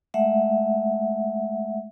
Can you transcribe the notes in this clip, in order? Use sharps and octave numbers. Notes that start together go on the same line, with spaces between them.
G#3 A3 E5 F#5